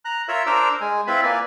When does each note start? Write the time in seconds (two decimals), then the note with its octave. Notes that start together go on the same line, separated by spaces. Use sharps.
0.05 A#5 F#6
0.28 F4 A#4 C#5 E5 E6
0.46 D4 A#4 C5 A#5 D6 E6
0.81 G#3 G#5
1.07 C4 E4 F4 B4 E5 B5
1.23 A#3 B4 D5 G#5